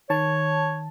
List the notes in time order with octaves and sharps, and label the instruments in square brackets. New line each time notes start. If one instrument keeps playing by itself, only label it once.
[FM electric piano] D#3 A5 [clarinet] C#5